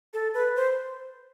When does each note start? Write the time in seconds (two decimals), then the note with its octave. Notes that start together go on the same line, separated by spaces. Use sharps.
0.14 A4
0.34 B4
0.56 C5